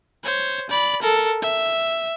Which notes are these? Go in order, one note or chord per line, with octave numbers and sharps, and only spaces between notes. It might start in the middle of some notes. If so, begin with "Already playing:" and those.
C5 C#5
D5 B5
A4 A#4
E5